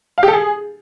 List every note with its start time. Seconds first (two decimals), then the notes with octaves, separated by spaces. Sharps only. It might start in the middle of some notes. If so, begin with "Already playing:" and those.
0.18 F5
0.23 G4
0.28 A4
0.33 G#4